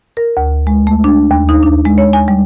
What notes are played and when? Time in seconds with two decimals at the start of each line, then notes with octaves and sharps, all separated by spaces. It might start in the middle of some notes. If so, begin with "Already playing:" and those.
0.17 A#4
0.37 D2
0.67 G#3
0.87 A3
1.04 D4
1.31 D#2
1.49 D#4
1.63 D4
1.85 G#3
1.98 C#5
2.13 G#5
2.28 G3